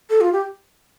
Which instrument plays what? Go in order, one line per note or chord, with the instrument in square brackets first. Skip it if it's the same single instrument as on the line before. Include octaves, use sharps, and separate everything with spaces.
[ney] A4
F4
G4